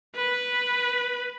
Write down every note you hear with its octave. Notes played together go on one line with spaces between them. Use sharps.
B4